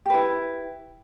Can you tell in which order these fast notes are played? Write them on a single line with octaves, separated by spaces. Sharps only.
G4 B4 E4